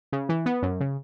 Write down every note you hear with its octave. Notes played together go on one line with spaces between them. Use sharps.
C#3
E3
B3
F#2
C#3